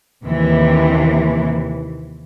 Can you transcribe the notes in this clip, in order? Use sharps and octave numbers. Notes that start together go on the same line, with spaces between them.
D#2 C3 E3